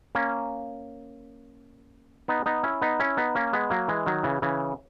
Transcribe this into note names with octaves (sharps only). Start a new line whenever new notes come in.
A#3 C#4
B3 D#4
B3 D#4
C#4 E4
B3 D#4
C#4 E4
B3 D#4
A#3 C#4
G#3 B3
F#3 A#3
E3 G#3
D#3 F#3
C#3 E3
C#3 E3